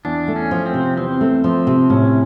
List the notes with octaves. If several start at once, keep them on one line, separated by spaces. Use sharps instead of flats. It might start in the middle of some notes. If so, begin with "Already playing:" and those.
E2 D4
A3
C#4
F3
C4
C3
E2 C4
A3
F3
C3
A2 C#4